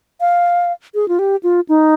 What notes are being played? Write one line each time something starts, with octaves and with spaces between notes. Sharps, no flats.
F5
G#4
F4
G4
F4
D#4